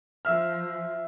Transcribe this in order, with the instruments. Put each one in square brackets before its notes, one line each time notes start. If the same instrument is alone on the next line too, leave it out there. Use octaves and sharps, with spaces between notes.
[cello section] F3 [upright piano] E5 F6